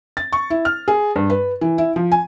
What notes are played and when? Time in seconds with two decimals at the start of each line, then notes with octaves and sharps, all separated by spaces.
0.17 A6
0.33 C#6
0.50 E4
0.65 F6
0.88 G#4
1.16 G2
1.30 B4
1.61 E3
1.78 E4
1.96 F3
2.12 G#5